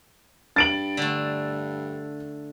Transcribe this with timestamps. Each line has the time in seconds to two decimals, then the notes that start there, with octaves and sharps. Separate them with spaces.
0.56 G2 A6 D7 F#7
0.97 D3 A3